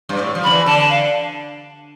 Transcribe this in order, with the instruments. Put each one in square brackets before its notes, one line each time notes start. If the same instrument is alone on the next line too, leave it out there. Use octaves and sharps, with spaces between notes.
[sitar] G2
A2
F3
[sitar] D3 [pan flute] B5
[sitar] E3
[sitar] D3 [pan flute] A5
[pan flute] A5
F5